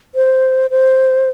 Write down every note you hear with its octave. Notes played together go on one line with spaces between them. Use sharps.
C5
C5